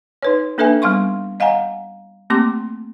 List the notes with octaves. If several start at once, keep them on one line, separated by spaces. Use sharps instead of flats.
D#4 B4 C#5
A#3 D4 A4 B4 E5 G#5
G3 B3 F5 C6 C#6
D#5 F5 F#5 G#5 A#5
A3 A#3 C4 G4 C6 D6